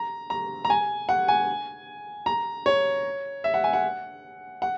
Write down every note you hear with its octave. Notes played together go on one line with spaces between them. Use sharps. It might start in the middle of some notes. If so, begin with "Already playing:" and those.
Already playing: A#5
A#5
A#5
G#5
F#5
G#5
A#5
C#5
E5
F#5
G#5
F#5
F#5